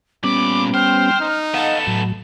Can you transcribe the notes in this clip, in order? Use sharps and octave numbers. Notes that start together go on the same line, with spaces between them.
A#2 G3 B3 C#4 B5 D6
C5 G5 F6
D#4
B3 A4 D#5 F5 F#5 E7
A2 F#3